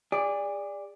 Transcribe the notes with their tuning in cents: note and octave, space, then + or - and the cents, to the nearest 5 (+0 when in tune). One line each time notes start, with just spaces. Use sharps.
G#4 -35 D5 +0